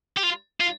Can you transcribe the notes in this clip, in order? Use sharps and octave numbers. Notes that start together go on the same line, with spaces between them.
G4
F4
F4